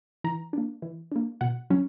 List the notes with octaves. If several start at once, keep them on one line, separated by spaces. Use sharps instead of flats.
E3 A#5
A#3 D4
E3
A#3 D4
B2 F#5
F#3 C#4